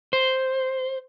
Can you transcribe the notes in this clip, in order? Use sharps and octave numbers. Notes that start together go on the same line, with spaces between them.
C5